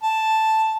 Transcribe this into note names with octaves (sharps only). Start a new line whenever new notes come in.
A5